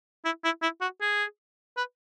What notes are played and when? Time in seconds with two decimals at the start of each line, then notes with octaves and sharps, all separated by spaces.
0.25 E4
0.44 E4
0.62 E4
0.81 F#4
1.01 G#4
1.77 B4